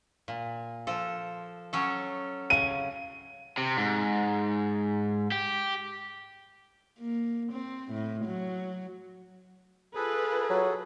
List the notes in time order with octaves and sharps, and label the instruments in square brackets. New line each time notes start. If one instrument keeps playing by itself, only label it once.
[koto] A#2
F3 A4
F#3 C#4 A4
[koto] C#3 [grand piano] D#7
[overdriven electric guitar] C3
G#2
G4
[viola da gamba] A#3
C4
A2
F#3
[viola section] F4 B4 [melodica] G#4 A4
[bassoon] F#3